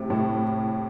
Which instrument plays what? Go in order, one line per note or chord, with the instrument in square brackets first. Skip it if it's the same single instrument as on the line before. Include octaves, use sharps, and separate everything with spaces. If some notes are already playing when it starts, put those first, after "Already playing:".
Already playing: [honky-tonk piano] A2 C3
A2